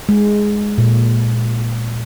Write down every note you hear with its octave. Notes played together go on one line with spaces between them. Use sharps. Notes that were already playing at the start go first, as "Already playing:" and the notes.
G#3
A#2